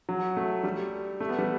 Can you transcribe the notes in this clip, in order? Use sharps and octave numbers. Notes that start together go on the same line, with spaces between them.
F#3
A3
G3
A3
B3
G3